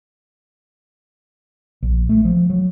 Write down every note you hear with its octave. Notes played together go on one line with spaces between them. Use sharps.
A#1
A3
F3
F#3